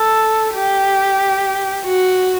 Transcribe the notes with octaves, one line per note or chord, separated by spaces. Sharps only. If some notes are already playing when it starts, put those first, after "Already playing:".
Already playing: A4
G4
F#4